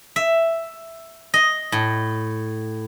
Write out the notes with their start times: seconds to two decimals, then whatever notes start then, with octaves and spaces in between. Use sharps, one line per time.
0.16 E5
1.34 D#5
1.72 A2